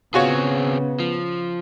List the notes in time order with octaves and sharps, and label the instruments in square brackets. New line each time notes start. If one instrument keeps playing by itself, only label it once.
[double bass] C#3 [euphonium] B3 [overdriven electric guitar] C4 G#4 [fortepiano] F4 F#4 C#5
[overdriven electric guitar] F3